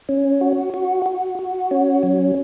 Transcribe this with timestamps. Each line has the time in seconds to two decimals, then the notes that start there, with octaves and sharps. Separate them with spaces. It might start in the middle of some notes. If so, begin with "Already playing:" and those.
0.09 C#4
0.41 F#4
0.74 F#4
1.06 F#4
1.39 F#4
1.71 C#4
2.03 F#3